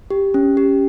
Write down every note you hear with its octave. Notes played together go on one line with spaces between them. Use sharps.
G4
C#4
G4